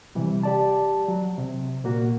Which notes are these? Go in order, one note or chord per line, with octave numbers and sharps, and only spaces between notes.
C3 E3 G3
G4 D5 A5
F#3
C3
A#2 A#3 F#4